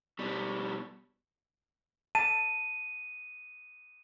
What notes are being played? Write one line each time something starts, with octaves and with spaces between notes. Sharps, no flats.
B2 G3
A5 D#7